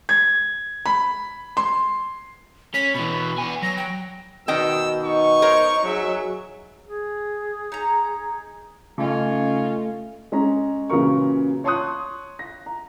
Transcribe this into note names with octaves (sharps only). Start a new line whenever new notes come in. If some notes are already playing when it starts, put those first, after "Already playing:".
G#6
B5
C6
C#4 B6
B2 E3 B5
B3 G#5
F#3 A#6
G5
B2 D#3 D#5 G5 E6
D#4 C#6
A#4 C5 C#5
F#3 G#4 E5
G#4
D#4 A#5
C#3 A3 C#4 D#4 F4
G#3 C#4 A#5
A#2 C#3 E3 F#3 A#4 C#6
C#5 A5 C6 C#6 D#6 F#6
A#6
A#5